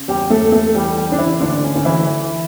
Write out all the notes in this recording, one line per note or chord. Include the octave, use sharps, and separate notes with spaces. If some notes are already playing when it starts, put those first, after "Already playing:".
Already playing: C#3
E2 G3 G4
A3 A4
E2
A3 A4
E3 G3 G4
G3 G4
C#3 D4
E3 E4
D2 D3 D4
C#4
D2
E3 E4
E3